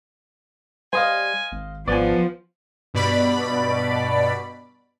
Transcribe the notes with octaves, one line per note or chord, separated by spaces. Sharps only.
G3 C5 D#5 F5 G#5
G#1
G#1 F3 B3 D5 G#5
G2 B2 D5 B5